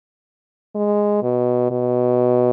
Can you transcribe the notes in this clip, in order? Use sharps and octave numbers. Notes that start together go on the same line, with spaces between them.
G#3
B2
B2